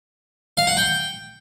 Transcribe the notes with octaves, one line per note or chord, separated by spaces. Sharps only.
F5
F#5
G5